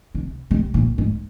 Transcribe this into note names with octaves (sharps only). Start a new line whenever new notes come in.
C3
C3
A#2
G#2